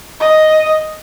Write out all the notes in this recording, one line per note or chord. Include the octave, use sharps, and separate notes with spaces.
D#5